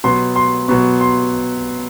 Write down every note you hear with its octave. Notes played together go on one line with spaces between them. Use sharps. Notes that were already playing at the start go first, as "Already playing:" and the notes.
B2 F#3 B3 C6
C6
B2 F#3 B3 C#6
C6